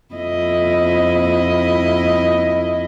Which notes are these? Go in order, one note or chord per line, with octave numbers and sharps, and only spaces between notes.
F2 E4 D#5